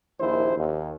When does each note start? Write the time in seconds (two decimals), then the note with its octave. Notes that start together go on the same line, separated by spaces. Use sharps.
0.20 A#1 D#2 E4 C5
0.56 D#2